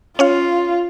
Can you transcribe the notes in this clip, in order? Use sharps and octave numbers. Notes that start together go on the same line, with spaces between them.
C#4 F4 C#5 F5